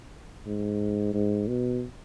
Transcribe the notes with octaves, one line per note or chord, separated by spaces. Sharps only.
G#2
G#2
B2